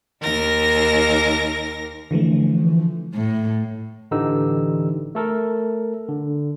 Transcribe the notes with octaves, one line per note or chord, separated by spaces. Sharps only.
D#2 A#4 A#6
D3 E3 F3 A3
A2
A1 D3 E3 D#4 G4 E6
A3 A4 A#4
D3